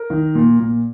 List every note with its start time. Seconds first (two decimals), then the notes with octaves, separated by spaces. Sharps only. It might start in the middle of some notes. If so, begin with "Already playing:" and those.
Already playing: A#4
0.10 D#3
0.35 A#2
0.59 A#2